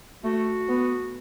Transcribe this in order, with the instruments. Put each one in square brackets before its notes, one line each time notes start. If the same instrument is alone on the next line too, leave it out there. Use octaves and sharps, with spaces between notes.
[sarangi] A3 [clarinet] F#4
[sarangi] B3